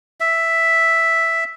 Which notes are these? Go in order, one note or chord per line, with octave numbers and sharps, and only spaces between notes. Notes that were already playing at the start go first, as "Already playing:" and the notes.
E5